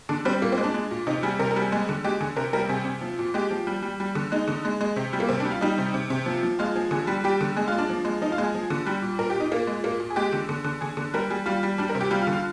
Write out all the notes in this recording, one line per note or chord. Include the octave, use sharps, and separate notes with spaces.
D3 D4
G3 C4
A#2 A#3
C4
G#3
D4
G#3
A#2
C3 D#4
G3 G#4
C3 A#4
A#4
G3
G#4
G#3 G#4
D3
G#3 G4
D3 G#4
C3 A#4
G3 A#4
C3 G#4
C3
F3
A#2
G#3 G4
F3
G3
G3
G3
D3
G#3 D#4
D3
G#3
G#3
C3
G3
A#3
C3 C4
D4
G3
F4
G3 D#4
C3
C3
C3
F3
F3
G#3 F4
F3 G#4
D3 G#4
G3
G3 G4
D3
G#3 G#4
F4
G#3
D4
F3
G#3
F3 D#4
F4
G#3
G#4
F3
D3
G3
A#2
A#2 A#4
G4
A#2 D#4
A#2 A#3
G#3
A#2 A#3
A#2
G#4
G#3 G4
D3
D3
D3
D3 G#4
D3
G3 A#4
G3 G#4
G3 F4
G3
G3 D4
A#4
C3
G4
G3 F4
F4
D3
F4